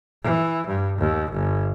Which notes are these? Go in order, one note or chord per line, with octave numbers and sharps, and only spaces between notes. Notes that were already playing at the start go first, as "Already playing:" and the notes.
E3
G2
D#2
G1